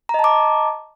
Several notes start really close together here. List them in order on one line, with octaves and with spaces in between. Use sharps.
A#5 D#5 A5 D6